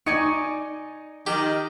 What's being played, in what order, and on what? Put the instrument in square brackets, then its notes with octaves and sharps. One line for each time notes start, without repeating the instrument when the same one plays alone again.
[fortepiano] D#4 [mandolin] D5 G#5 C#6
[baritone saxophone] D#3 [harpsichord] G4